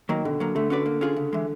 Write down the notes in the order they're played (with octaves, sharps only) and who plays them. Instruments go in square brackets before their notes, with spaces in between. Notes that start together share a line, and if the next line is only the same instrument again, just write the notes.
[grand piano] D#3 [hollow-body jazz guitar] F#3 A#3
[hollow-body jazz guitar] B2 [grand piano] D3
[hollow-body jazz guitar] F#3 A#3
[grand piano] D3 [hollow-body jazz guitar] A3
[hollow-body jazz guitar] C#4 F#4 B4 D5
A#3
C#4 F4 G#4
C#3
E3 G#3